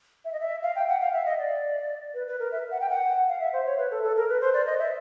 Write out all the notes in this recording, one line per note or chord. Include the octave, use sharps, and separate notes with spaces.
E5
D#5
E5
F5
G5
F#5
F5
E5
D#5
D5
B4
B4
A#4
E5
F#5
G5
F#5
F5
E5
C5
C#5
B4
A4
A4
A#4
B4
C5
D5
D#5
E5